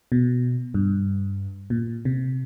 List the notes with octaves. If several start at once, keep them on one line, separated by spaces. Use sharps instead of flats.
B2
G2
A#2
C3